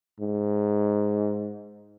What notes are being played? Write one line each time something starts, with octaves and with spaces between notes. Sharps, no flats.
G#2